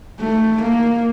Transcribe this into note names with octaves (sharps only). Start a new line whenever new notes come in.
A3
A#3